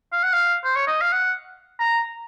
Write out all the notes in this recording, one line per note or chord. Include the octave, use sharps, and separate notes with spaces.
F5
F#5
F5
C5
C#5
D#5
F5
F#5
A#5